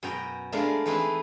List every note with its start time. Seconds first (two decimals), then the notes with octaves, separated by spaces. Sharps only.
0.03 F#2 B2 F#4 G5 A#5
0.52 G#3 A3 B3 D4 A#4 F5
0.86 E3 A3 C4 D#4 G#4 B4